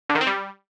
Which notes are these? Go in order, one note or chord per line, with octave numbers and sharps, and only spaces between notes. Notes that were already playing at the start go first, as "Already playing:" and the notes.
D3
D#3
C4
G3